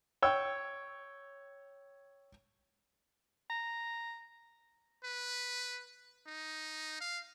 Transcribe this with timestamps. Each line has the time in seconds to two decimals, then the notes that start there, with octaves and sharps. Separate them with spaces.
0.22 C#5 G5 E6
3.50 A#5
5.04 B4
6.27 D#4
7.01 F5